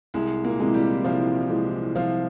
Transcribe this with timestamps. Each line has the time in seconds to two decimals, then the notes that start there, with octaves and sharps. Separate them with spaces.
0.14 C2 G#3
0.44 A#2 A#3
0.60 C3 E3 G#3
0.74 G3 G4
1.04 C2 F3 F4
1.50 C3 E3 G#3
1.95 C2 F3 F4